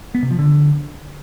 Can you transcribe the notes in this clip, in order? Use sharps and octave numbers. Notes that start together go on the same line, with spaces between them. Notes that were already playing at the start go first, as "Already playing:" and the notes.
B3
C3
F3
D3